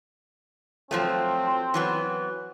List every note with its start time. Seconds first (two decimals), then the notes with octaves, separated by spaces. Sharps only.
0.91 F3 F#3 A3 C4
1.74 E3 F#3 B3